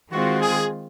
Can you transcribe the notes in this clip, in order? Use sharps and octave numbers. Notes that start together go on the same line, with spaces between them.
D#3 G#3 C4 F4 F#4
G#4